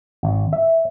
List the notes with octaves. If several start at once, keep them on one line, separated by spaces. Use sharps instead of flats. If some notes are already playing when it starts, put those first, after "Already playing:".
G#1
E5